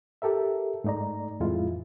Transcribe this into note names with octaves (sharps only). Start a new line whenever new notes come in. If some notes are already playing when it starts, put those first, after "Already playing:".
G4 A4 A#4 E5
G#2 A3 D#4 D5 A#5
F2 A2 E3 G#3 E4 F4